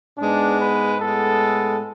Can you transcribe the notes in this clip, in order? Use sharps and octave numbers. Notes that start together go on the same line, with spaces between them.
G#2 G#3 B3 D4
B4
A2 G#3 B3 A4